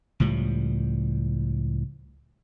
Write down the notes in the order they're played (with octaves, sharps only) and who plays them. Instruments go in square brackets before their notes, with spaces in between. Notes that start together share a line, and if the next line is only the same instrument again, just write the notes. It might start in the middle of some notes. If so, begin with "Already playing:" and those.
[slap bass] C#2 A2 F3 G3